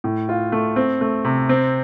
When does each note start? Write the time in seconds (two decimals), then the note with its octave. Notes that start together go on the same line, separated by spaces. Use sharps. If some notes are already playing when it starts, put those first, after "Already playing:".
0.04 A2
0.29 F4
0.52 A3
0.76 C4
1.01 A3
1.25 C3
1.49 C4